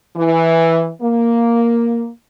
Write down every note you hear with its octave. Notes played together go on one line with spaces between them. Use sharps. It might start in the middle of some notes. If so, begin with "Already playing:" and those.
E3
A#3